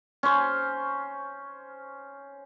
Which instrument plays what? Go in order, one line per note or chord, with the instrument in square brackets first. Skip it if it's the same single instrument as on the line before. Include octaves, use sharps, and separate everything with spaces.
[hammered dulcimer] C#4 C5